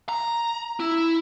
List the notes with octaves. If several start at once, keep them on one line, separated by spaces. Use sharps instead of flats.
A#5
E4